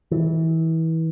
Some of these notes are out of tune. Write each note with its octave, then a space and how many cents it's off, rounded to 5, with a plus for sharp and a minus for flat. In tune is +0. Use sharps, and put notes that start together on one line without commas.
E3 -30